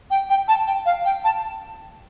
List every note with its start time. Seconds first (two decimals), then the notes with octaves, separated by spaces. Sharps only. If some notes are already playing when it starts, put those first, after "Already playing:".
0.11 G5
0.29 G5
0.48 A5
0.67 G5
0.86 F5
1.05 G5
1.24 A5